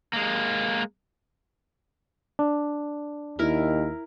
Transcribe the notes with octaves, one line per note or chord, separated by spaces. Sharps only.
G#3 A#3
D4
D#2 E4 A#4